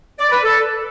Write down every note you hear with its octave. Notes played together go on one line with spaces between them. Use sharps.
D5
B4
A4